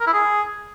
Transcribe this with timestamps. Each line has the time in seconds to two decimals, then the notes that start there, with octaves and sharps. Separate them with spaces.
0.01 A#4
0.07 E4
0.13 G#4